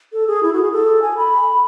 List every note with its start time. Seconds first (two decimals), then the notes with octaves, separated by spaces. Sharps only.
0.13 A4
0.27 G#4
0.43 E4
0.53 F#4
0.62 G#4
0.72 A4
1.02 G#5
1.17 B5